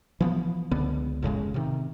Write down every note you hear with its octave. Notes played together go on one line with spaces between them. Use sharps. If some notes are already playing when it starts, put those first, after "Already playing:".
E3 F3 B3
C#2 D3 B3
F1 A2 C#3 G#3
C3 D#3